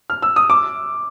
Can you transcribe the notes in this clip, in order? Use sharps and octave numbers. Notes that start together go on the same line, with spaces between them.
F6
E6
D#6
D6